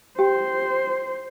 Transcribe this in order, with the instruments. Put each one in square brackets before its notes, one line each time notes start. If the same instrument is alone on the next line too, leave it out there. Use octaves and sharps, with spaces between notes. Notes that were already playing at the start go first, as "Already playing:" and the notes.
[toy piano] G4 G5 [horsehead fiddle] C5